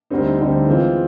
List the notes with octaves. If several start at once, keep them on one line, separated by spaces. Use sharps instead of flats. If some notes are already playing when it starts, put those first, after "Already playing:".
D2 D3 G3 C4 D#4
D2 D3 G3 C4 D#4
E3 G#3 C4 F4